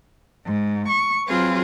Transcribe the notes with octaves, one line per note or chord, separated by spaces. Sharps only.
G#2
C#6
F#3 C4 F4 G#4 B4